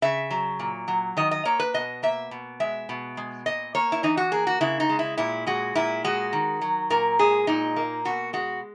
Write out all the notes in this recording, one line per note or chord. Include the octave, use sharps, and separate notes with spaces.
C#3 E5
F#3
A#2
F#3
D#3 D#5
D#5
A#3 C#5
B4
B2 D#5
A#3 E5
B2
G#3 E5
B2
G#3
A#2 D#5
A#3 C#5
E4
E3 D#4
F#4
A#3 G#4
F#4
C#3 E4
D#4
G#3
E4
A#2 E4
G#3 F#4
A#2 E4
G#3 F#4
D#3
F#3
A#2 A#4
G#3 G#4
A#2 D#4
A#3
B2 F#4
G#3 F#4